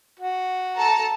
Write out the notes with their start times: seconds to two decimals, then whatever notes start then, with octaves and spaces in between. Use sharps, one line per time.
0.19 F#4
0.77 A4 A5 A#5